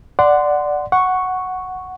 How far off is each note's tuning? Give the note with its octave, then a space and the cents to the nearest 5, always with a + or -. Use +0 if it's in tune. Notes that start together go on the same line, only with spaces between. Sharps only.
D5 +0 F#5 +0 C6 -20
F#5 +0 C#6 +0